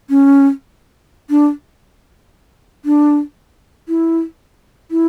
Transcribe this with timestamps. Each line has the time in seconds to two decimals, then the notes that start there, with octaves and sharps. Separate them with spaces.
0.10 C#4
1.30 D4
2.85 D4
3.88 E4
4.91 E4